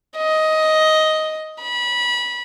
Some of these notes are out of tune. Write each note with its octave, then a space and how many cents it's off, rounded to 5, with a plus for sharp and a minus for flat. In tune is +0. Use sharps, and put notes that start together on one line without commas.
D#5 +10
B5 -25